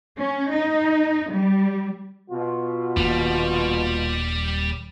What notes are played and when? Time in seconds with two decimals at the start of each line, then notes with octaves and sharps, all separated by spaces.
0.18 C#4
0.51 D#4
1.30 G3
2.31 B2 F4
2.97 D#1 D#2 G3